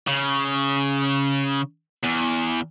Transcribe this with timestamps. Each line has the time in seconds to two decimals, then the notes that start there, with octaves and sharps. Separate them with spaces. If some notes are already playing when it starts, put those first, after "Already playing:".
0.07 C#3
2.03 E2